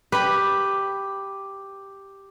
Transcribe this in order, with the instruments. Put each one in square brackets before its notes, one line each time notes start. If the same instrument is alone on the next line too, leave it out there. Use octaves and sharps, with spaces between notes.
[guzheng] G4 B5 [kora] B4